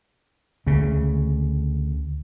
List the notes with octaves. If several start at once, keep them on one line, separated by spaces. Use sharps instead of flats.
D2 C#3